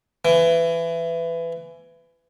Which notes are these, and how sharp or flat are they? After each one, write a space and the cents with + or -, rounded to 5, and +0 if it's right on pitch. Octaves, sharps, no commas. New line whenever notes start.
E3 +20